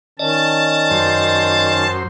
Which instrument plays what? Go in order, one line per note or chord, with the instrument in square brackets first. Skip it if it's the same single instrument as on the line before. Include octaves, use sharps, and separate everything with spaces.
[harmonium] D#3 C#4 [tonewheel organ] D5 D#5 [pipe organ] A5
[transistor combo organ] F#2 C5